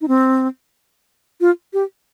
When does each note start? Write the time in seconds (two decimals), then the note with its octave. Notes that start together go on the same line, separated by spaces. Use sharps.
0.01 D#4
0.08 C4
1.41 F4
1.73 G4